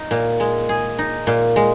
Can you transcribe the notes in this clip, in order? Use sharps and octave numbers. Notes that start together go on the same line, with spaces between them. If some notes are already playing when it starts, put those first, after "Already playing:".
Already playing: D#4
A#2
G#3
G#4
D#4
A#2
G#3